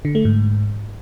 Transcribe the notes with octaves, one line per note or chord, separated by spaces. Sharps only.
D3
A3
G#2